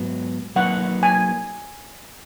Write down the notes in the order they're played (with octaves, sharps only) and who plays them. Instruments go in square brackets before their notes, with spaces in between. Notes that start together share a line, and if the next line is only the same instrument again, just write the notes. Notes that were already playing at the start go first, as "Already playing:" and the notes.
Already playing: [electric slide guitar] G#2 F#3 B3
[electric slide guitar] F#3 A#3 D#4 F#4 B4 [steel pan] F#5
[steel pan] G#5